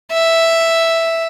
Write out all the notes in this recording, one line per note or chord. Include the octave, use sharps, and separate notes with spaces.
E5